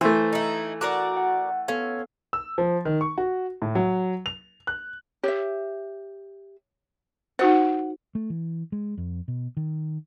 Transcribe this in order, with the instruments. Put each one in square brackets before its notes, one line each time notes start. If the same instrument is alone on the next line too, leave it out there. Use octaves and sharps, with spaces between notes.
[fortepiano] E3 A3 [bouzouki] C5
[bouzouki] D#4 E4
[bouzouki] F#4 A#4 D5 [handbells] D6
[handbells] F#5
[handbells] B3 A4 F5 [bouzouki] C#4
[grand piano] E6
F3
D#3
C#6
F#4
A2
F#3
F7
F#6
[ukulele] G4 E5 [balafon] C#5
[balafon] D#4 F#4 C5 [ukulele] F#5
[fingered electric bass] A3
E3
G#3
F2
B2
D#3